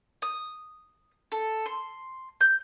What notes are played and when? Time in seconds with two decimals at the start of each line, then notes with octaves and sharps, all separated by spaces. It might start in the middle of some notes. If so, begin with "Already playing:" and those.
0.22 D#6
1.32 A4
1.66 C6
2.41 G6